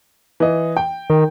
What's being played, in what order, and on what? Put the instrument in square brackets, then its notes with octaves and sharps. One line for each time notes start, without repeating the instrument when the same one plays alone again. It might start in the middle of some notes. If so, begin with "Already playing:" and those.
[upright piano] E3 D#5
G5
[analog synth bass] D#3